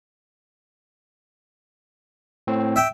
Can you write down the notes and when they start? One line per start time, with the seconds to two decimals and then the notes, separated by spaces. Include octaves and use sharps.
2.47 A2 C4
2.76 E5 G5